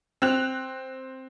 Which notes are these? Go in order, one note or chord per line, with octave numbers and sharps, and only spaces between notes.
C4 F#6 F7